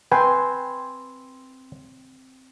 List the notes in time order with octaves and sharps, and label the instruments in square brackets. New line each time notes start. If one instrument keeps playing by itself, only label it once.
[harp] C4 C6 G#6 [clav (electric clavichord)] B4 G5 G#5